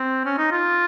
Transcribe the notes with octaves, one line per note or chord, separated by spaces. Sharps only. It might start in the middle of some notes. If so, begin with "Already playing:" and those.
Already playing: C4
C#4
D#4
F4